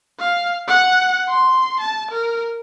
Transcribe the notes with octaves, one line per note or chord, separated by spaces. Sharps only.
F5
F#5
C6
A5
A#4